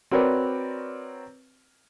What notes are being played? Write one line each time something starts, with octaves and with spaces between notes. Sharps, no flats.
C4 F#4 A#4 B4 C#5 D5